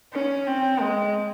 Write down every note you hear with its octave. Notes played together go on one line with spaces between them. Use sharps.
C#4
C4
G#3